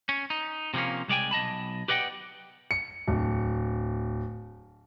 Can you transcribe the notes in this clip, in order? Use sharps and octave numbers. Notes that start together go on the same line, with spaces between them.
C#4
D#4
C3 F3 G3 A#3 C#4
C2 G#3 D5 G5 G#5
B1 D#5 A5 B5
G4 B4 D5 D#5 F#5 G5
C#7
D1